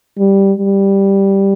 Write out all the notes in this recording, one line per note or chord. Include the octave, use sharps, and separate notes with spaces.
G3
G3